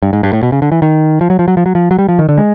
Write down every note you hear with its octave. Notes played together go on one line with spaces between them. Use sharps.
G2
G#2
G2
A2
B2
C#3
D3
E3
D#3
F3
F#3
F3
F#3
F3
F#3
F3
F#3
G3
F3
D#3
D3
G#3